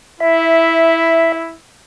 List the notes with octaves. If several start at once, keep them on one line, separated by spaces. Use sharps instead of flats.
E4 E5